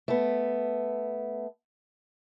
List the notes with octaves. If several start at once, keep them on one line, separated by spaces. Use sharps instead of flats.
A3 B3